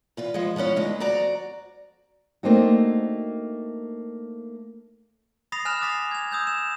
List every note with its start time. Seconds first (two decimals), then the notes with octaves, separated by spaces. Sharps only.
0.17 E2 F4 B4
0.34 F3 G#3
0.56 F3 G#3 B3 C#4 E4
0.76 D2 E3 G#3 D#4 B4
1.00 F2 F#4 D5 A#5
2.43 A3 A#3 C4 D4 D#4 F#4
5.52 B5 D#6 A6 A#6 C7 F7
5.65 G#5 F6 F#6 E7 F7
5.81 D6 D#6 A6 B6 C7 F7
6.11 G#6 F7
6.31 D#6 E6 G6 G#6
6.47 E7